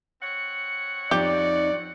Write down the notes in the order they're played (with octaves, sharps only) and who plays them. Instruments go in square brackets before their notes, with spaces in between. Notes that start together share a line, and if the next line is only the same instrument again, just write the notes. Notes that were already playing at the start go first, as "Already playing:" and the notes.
[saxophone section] C4 C#5 F#5
[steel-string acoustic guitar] F2 D#4 [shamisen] G4 [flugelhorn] D5